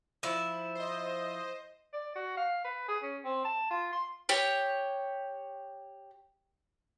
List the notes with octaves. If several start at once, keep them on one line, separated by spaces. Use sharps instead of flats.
F3 E4
C5 D#5
D5
F#4
F5
B4
G#4
C#4
C4
A5
F4
C6
G4 C#5